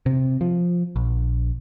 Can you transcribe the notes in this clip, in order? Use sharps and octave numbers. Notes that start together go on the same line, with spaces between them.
C3
F3
A#1